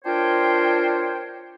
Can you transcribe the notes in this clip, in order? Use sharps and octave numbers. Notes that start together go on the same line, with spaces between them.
D4 F4 A#4 C5 C#5 G5